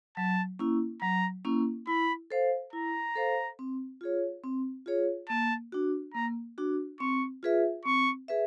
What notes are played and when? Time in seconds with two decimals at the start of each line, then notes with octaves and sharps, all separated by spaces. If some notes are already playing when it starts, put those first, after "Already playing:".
0.17 F#3 A5
0.59 A#3 C#4 E4
1.02 F#3 A#5
1.45 A#3 C#4 E4
1.87 E4 B5
2.31 A4 C5 F5
2.73 E4 A#5
3.16 A4 C5 F5
3.59 C4
4.01 F4 G#4 C#5
4.44 C4
4.86 F4 G#4 C#5
5.29 A#3 A5
5.72 D4 F#4
6.14 A#3 A#5
6.58 D4 F#4
7.00 C4 C#6
7.43 F4 G#4 B4 E5
7.85 C4 C#6
8.28 G#4 B4 E5